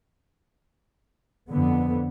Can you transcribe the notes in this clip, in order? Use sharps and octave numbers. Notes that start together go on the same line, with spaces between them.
F2 D3 B3